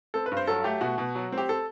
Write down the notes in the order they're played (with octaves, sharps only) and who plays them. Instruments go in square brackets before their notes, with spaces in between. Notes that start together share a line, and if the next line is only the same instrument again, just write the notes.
[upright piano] C4 A4
B4
G2
C5
F#3 A4
A3 G4
B2 F#4
B2
F#3
C4
G4
A4